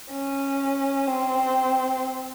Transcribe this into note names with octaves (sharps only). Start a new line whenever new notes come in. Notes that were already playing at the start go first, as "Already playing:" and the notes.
C#4
C4